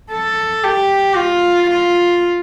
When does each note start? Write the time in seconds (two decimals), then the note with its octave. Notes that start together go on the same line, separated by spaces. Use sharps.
0.11 A4
0.64 G4
1.16 F4
1.70 F4